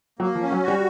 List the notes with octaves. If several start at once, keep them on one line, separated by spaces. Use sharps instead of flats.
F#3 A#3
F3
C#4
F#3
F#4
G3